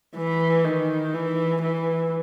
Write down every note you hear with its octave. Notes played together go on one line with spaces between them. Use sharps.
E3
D#3
E3
E3